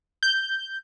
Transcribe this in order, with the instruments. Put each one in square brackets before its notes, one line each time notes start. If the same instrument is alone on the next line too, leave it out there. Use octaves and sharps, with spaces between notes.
[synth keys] G6